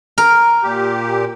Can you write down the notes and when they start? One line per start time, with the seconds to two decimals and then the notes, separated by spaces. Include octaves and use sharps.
0.18 A#4
0.63 A#2 G4